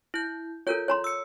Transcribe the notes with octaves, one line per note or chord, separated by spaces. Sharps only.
E4 G6
F4 A4 A#4 C#5 G6
C#5 A#5 C6
E6 C#7